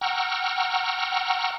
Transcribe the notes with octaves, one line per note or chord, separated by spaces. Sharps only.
F#5 G5 A#5 C#6 E6 F6